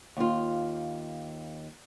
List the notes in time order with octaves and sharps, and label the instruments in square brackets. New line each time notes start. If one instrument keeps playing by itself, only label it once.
[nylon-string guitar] D#2 F4